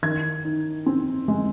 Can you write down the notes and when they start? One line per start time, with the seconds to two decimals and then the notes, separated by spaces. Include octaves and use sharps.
0.03 D#3 G#6
0.45 D#4
0.86 C4
1.28 G#3